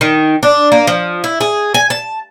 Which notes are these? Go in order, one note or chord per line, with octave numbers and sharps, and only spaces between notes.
D#3
D4
A#3
F3
E4
G#4
G#5
A5